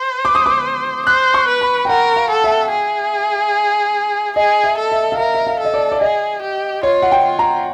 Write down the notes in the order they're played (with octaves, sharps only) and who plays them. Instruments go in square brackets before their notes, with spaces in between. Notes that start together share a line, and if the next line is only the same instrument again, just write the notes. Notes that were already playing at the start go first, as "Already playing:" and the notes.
Already playing: [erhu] C5
[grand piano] D6
D#6
D6
[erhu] C5 [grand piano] F#6
[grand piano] C#6
[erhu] B4
[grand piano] B5
G5
[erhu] A#4 [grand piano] F#5
[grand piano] F5
[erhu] A4
[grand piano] E5
[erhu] G#4
[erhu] G#4 [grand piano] D#5
[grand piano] E5
[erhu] A4
[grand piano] E5
F5
[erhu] A#4 [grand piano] E5
[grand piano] E5
F5
[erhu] A4 [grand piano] D#5
[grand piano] D5
D5
[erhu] G#4 [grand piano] D#5
[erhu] G4
[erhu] F4 [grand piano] C#5
[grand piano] F#5
G5
[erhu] F4
[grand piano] A#5